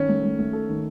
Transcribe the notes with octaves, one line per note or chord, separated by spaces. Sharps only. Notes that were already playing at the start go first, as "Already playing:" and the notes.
Already playing: D#3 C#4
A3
A3
A3
A4
D#3